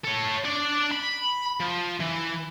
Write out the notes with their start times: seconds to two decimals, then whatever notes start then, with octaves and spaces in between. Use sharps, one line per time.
0.05 A4 C#5
0.45 D4 D5
0.92 B5
1.60 F3
2.01 E3